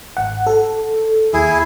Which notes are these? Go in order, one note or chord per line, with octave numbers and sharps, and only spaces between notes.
G#1 F#5
A4
D#2 E4 G#4